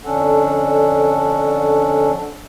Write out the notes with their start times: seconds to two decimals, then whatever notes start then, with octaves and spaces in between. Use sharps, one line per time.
0.05 F2 D3 C#4 D4 A4 F#5